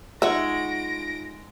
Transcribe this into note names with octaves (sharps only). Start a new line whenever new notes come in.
G#3 D#4 F4 E5 F#5 C#6 A#6 D7